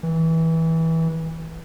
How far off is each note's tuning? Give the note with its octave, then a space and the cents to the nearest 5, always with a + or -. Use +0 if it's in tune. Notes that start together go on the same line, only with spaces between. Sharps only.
E3 -20